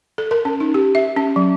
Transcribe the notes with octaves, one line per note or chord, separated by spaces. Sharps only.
A4
A#4
C#4
D#4
G4
E5
C#4
F#3